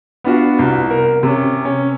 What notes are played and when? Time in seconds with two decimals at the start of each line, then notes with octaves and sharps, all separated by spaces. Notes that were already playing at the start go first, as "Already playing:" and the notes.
0.24 B3 D4 F4 F#4
0.59 C2
0.90 A#4
1.23 C3 C#4
1.65 C#4